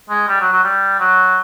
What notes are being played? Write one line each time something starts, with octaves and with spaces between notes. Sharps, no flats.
G#3
G3
F#3
F#3
G3
F#3